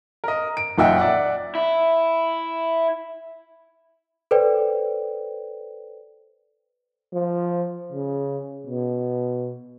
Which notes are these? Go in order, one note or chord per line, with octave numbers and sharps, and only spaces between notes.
A#4 D#5
D7
F#1 A#2 D#4 E5 F#5 G5
D5 E5 F#5
E4
A4 B4 C5 D5 G5
F3
C#3
B2